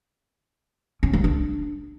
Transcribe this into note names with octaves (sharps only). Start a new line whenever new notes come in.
C#4
G3
D4